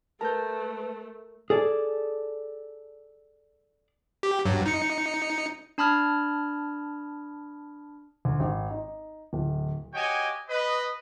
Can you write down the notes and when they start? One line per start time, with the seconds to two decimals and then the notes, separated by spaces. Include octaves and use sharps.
0.21 A3 A#4 B4 A5 G6
1.50 G#4 A4 D5
4.23 G4
4.45 G2 F#3
4.66 D#4 C#7
5.78 D4 A5 B5 D#6 F6 G#6
8.25 D2
8.40 G#1
8.70 D#4
9.33 D1
9.94 F#4 G4 C#5 D#5 G5 G#5
10.49 B4 D#5